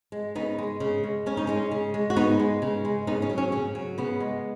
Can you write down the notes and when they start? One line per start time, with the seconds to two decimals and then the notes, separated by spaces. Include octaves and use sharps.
0.12 G#3
0.35 C#3 B3 D#4
0.58 G#3
0.80 C#3
1.04 G#3
1.26 C#3 C#4
1.37 D#4
1.47 G#3 C#4
1.71 C#3
1.94 G#3
2.10 F#4
2.16 C#3 B3 D#4
2.39 G#3
2.62 C#3
2.85 G#3
3.07 C#3 B3 D#4
3.22 C#4
3.30 F#3
3.38 C#4
3.52 C#3 C#4
3.75 F#3
3.98 C#3 B3
4.20 G#3